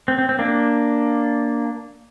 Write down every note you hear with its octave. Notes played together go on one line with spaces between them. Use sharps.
C4
C4
C4
A#3 D4